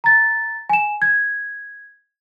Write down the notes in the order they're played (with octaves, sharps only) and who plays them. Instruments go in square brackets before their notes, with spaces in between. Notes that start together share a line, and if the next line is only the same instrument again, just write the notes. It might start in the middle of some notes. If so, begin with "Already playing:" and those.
[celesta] A#5 A6
G#5 E7
G#6